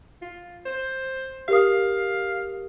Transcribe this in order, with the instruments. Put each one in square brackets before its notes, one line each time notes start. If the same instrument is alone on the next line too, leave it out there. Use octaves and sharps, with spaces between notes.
[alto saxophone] F4
C5
[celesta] G4 A#4 D#6 [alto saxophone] F5